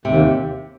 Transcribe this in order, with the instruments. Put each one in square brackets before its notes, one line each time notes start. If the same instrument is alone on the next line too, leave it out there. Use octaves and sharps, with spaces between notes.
[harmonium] D#2 [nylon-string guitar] C3